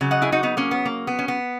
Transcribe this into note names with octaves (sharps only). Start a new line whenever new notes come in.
C#3 F#3
D#5 F#5
E4 G#4
D#4 F#4
B3 D#4
A#3 C#4
B3
A#3
B3
C#4
B3